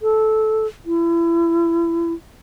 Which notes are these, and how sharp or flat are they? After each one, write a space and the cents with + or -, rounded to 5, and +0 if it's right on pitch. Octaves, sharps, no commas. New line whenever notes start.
A4 -15
E4 +30